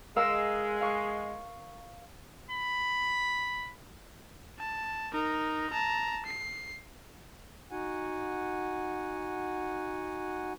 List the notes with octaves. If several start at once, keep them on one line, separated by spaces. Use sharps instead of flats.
G#3 A#4 F5 E6
F5 C#6
B5
A5
D#4 A#4
A5 A#5
C7
D#4 F#4 F#5 G#5